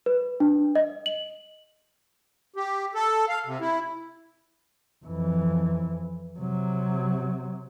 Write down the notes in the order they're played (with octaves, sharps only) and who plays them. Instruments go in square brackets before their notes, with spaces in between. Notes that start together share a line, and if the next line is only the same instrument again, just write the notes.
[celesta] B4
D4
D#5
F#7
[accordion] G4
A4
F5
C3
E4
[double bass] F2 E3
C3 F#3